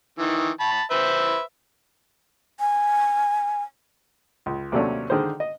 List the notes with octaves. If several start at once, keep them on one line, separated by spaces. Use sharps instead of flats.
D#3 E3
A5 B5
B4 C5 E5
G#5
C#2
D#2 C3 F#3 A3 C#4 D4
D3 D#3 G#3 C5
D#5